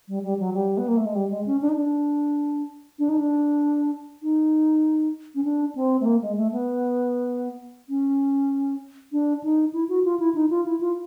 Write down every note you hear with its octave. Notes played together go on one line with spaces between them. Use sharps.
G3
G3
F#3
G3
B3
A#3
A3
G#3
G3
G#3
C#4
D4
D#4
D4
D4
D#4
D4
D#4
C#4
D4
C4
A3
A#3
G#3
A3
B3
C#4
D4
D#4
E4
F#4
F4
E4
D#4
F4
E4
F4